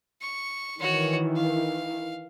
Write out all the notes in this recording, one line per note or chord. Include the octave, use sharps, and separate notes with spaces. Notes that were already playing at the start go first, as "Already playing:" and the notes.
C#6
D#3 E3 F#4 C#5
F5